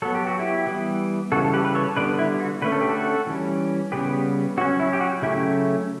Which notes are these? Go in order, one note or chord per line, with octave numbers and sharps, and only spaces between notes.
F#3 B3 A4
G4
F#4
E4 G4
E3 G3 B3
C#3 E3 G3 F#4 A4
A4
G4 B4
B4
A4 C#5
D3 G3 B3 B4 D5
E4
F#4
D3 A3 C#4 B4
A4
G4
F#4 A4
E3 G3 C#4
C#3 G3 B3 G4 B4
F#3 C#4 F#4
E4
G4
F#4
C#3 F#3 A3 C#4 E4 G4